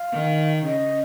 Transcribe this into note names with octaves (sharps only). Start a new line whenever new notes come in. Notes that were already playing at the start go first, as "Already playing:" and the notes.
Already playing: F5
D#3
C#3 D#5